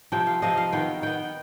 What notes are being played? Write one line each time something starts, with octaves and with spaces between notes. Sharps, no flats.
C3 F3 C4 G5
F5
C3 F3 C4 D#5
F5
D#3 B3 G5
D#3 B3 G5